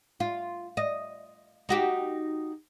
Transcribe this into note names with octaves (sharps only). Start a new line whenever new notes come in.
F4
D#5
D#4 F#4 G4